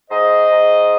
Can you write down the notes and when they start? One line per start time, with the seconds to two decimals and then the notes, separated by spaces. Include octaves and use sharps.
0.10 G#2 C5 D#5
0.49 G#2